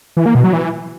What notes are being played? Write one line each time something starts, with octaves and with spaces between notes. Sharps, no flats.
E3
A#3
B2
F#3
E3